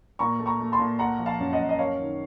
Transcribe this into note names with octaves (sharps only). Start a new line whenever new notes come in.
A#2 A#5 C#6
A3
A#5 C#6
A3
A5 C6
A#2
A3 F#5 A#5
F3
F5 A5
F#2
D#5 F#5
F#2
D#5
A#3 C#5 F5
D#3